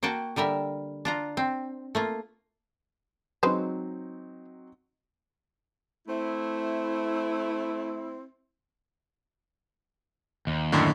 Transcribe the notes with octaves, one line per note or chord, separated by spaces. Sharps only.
A#3 F#4 G5 A5
D3 G3 A#4 E5
D4 F4 A#5
C4
A3 A#3 F4
F#3 G#3 C4 D#4 B4 C5
A3 C4 E4
D#2
F#2 A2 D3